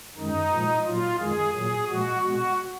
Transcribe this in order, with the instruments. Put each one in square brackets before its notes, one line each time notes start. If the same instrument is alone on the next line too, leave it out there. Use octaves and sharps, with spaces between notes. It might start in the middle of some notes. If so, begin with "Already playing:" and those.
[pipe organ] F#2 D#3 G#3 D#4
A#2 F3 G#3
A#2 F#3 F4
F2 D#3 G#3 G#4
A#2 F#3 G#4
A#2 F3 G#3 F#4
B2 G#3 F#4